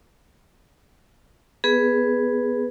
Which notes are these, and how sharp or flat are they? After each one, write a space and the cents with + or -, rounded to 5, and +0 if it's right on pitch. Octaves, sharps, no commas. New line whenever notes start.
B3 +0 G#4 +0 B4 +0